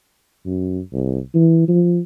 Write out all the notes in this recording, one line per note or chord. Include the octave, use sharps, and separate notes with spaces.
F#2
C2
E3
F3